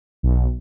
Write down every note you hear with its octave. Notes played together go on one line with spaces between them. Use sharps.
B1